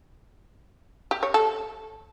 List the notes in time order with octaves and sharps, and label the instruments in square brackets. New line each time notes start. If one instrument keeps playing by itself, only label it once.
[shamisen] G4
C#5
A4